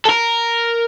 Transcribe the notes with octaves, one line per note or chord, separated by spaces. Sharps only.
A4
A#4